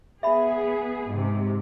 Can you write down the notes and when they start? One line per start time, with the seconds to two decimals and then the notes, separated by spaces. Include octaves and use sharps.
0.23 B3 G#4 E5 B5
1.11 G#2 C3